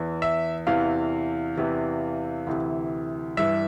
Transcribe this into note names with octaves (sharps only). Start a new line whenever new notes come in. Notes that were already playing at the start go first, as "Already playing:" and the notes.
Already playing: E2 E3
E5
E2 C3 E3 F5
E2 C3 E3
D2 C3 E3
G2 E3 E5